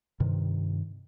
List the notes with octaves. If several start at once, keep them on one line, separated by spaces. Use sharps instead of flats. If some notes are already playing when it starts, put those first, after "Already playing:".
G2 C3 D#3